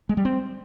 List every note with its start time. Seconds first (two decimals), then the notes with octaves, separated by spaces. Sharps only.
0.09 G#3
0.17 G3
0.25 C4